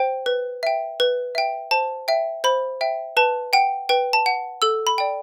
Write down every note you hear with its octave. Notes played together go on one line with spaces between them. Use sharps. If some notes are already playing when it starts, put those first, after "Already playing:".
Already playing: C5 G5
B4
E5 G5
B4
E5 G5
C5 A5
E5 G5
C5 B5
E5 G5
B4 A5
F#5 G5
B4 G5
A5
F#5
A4 E6
B5
D5 G5